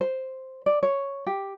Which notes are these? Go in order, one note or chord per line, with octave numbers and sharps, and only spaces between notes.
C5
D5
C#5
G4